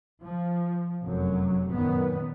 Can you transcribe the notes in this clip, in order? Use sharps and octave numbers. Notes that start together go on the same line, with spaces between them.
F3
F1 F#2 F#3
F#2 A#2 D#3 B3